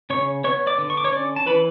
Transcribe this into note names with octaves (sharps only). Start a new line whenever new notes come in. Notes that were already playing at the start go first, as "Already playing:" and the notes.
C#3 C#5 C#6
B3 C#5 C#6
D5 D6
D3
C#6
D6
C#5 C#6
C#4 D5 D6
A5
E3 B4 B5